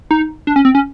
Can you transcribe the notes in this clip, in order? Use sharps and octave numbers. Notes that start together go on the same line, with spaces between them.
D#4
D4
C#4
C4
C#4